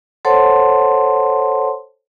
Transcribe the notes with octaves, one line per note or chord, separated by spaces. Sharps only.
A4 C5 C#5 F#5 A5 C6